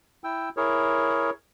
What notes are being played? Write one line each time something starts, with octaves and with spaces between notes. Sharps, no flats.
E4 G5 E6
E4 G#4 A#4 C#5